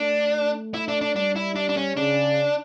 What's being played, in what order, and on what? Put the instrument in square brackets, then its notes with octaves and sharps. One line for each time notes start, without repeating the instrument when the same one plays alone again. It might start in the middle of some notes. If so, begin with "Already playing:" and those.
Already playing: [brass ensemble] A3 [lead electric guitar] D4
[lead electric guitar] E4
D4
D4
[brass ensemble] G3 [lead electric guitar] D4
[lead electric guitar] E4
D4
D4
C#4
[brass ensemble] C#3 [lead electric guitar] D4